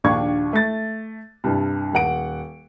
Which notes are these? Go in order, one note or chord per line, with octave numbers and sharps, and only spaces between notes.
A#1 D#2 D4 F5 C#6 G#6
A3 A6
C2 G2
D#1 F#5 D7